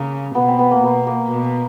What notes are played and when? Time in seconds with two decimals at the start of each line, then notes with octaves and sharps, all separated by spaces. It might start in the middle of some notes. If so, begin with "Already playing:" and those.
Already playing: C#3 A#3
0.35 B2 B3
0.48 C4
0.59 B3
0.71 A#3
0.83 B2 B3
1.07 A#3
1.31 B2